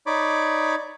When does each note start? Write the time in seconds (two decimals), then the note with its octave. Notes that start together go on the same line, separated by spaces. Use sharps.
0.07 D#4 C#5 D5 B5 D6